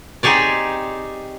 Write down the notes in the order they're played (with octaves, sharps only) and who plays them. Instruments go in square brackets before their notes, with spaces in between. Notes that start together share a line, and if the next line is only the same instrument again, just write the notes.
[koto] C4 D#4 G4 G#4 C#5 D5